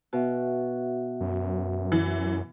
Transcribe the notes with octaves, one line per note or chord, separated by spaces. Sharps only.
B2 F#4 E5 F#5
F#2
E3